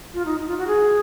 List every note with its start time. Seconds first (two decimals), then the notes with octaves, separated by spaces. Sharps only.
0.14 F4
0.25 D#4
0.40 D#4
0.48 F4
0.57 F#4
0.67 G#4